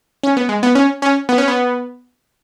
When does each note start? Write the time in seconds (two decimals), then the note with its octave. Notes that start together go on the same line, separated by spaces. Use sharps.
0.23 C#4
0.37 B3
0.49 G#3
0.63 B3
0.75 C#4
1.02 C#4
1.29 B3
1.38 C#4
1.48 B3